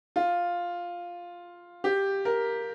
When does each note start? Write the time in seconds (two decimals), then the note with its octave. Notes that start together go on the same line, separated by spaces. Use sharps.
0.16 F4
1.84 G4
2.25 A#4